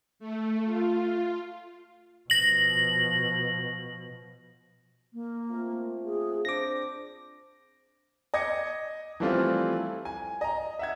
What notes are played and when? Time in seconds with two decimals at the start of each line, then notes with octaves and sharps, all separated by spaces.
0.20 A3
0.65 F4
0.99 F4
2.30 B2 F3 A#6 F#7
5.13 A#3
5.50 A3 C4 F4
6.06 G#4
6.45 C4 D4 C5 D6 A#6
8.34 D#5 D6 G#6 A#6 C#7
9.20 E3 F3 G3 A3 C4 F4
10.05 G#5
10.41 D#5 A#5
10.79 E5 F#5 G#6